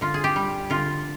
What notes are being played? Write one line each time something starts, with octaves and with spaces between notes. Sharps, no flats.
D3 F4
G#4
G4
G3
D3 F4